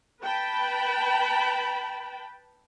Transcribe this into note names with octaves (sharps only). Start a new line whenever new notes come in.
B4 G5 A5 B5